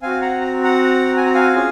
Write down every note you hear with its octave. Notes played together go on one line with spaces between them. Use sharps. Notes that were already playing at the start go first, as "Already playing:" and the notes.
C4 F#4 F5 G#5
F#5 A#5
A#5
F#5 A#5
G#5
A#5
F5 G#5
C#4 F4 G#4